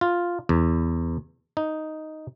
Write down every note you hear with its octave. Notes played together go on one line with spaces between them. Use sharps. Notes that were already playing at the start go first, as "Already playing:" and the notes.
F4
E2
D#4